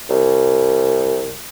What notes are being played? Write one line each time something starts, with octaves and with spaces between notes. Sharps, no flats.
C2